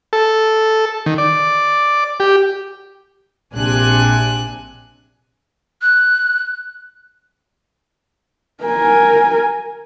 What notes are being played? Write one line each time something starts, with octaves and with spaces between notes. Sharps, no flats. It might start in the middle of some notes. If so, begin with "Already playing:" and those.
A4
D#3
D5
G4
A#1 C3 D4 G#5 F#6
F#6
A#4 G#5